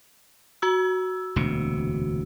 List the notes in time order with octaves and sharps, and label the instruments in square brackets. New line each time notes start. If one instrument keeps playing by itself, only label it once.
[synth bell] F#4 E6
[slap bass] E1 D2 C3